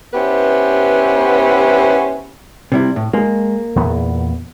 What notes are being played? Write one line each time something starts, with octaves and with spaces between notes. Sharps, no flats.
B3 C#4 E4 G4 B4 C5
C3 G3 E4
A2
G#3 A#3
E2 A#2 B3